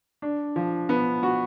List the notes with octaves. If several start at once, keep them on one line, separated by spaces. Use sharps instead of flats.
D4
F3
B3
F#4